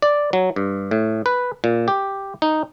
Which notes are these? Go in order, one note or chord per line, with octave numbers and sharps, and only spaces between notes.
D5
F#3
G2
A2
B4
A#2
G4
D#4